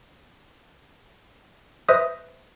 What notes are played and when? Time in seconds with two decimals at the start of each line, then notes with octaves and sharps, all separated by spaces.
1.89 B4 C5 D#5 E5 D#6